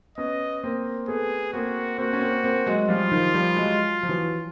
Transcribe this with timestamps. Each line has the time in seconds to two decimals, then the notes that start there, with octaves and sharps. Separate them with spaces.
0.18 B3 C#4 D#5
0.63 A#3 C4
1.08 A3 B3 G#4
1.53 A#3 C4 F#4
1.98 A#3 C4 F#4
2.13 C#4
2.20 A#3 C4
2.43 A#3 C4
2.66 F#3 G#3
2.88 F3 G3 F4
3.11 D#3 F3
3.34 F3 G3
3.56 F#3 G#3
4.03 F3
4.09 E3 F#3